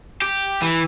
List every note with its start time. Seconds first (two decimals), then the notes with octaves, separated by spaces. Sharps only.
0.22 G4
0.62 E3